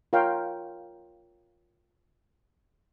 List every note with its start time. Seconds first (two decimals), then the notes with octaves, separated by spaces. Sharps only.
0.13 F4 A#4 C#5 F5 G5